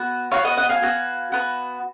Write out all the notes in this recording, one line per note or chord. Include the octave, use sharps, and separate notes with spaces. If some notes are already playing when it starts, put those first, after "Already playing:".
Already playing: B3 F#4
B3 F#4 C#5 F5
D#5 F#5
D#5 F#5
F5 G#5
B3 F#4
B3 F#4